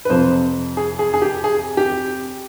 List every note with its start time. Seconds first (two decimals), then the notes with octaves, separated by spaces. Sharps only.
0.05 B4
0.10 F2 C3 F3 C5
0.77 G#4
0.99 G#4
1.14 G#4
1.22 G4
1.44 G#4
1.77 G4